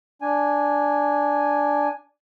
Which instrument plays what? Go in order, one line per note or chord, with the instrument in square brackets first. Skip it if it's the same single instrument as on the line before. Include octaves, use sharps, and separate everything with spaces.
[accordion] D4 G#5